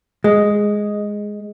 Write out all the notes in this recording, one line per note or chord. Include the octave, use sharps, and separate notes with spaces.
G#3